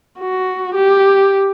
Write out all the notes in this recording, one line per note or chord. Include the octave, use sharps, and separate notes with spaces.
F#4
G4